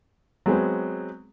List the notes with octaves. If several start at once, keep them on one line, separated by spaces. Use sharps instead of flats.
F#3 G#3 B3 C4